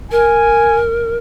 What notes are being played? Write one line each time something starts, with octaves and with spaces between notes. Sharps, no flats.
A#4 G#5